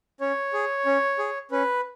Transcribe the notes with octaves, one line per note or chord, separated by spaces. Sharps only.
C#4 C#5
G#4
C#4
G#4
C#4 B4